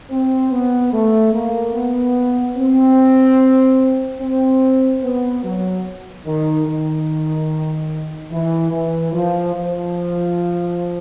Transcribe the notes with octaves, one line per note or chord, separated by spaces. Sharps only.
C4
B3
A3
A#3
B3
C4
C4
B3
F#3
D#3
D#3
E3
E3
F3
F3